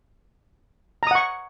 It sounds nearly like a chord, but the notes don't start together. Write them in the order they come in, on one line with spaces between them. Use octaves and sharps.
A#5 D#6 F#5 C#6